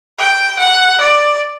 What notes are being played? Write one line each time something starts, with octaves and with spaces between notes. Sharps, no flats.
G5
F#5
D5